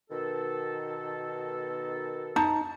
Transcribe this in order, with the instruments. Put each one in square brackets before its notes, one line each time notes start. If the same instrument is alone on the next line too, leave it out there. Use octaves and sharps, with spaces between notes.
[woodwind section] B2 D#3 A4
[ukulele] D#4 [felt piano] A5